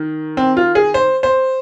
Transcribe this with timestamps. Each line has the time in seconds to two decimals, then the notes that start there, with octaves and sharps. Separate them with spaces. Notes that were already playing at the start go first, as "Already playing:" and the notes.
Already playing: D#3
0.37 C4
0.57 F4
0.75 G#4
0.94 C5
1.23 C5